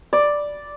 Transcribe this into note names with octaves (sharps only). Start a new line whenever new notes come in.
D5